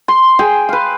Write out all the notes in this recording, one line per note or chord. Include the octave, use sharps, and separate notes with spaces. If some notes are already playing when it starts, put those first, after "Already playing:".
C6
G#4 G5 G#5
B4 F5